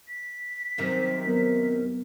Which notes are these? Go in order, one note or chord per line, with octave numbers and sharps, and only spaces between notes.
B6
F#2 C3 D#3 C4
F#3 B3 A#4